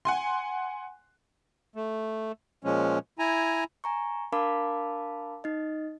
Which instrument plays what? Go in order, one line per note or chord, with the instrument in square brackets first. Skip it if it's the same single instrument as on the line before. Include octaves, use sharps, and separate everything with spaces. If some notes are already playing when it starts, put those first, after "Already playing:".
[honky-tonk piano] F#5 G#5 C6
[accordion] A3
A#2 F3 G#3 C#4
E4 G#5 A#5
[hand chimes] G#5 A#5 C#6
D4 A#4 F5 A5 B5 D6
D#4 D#5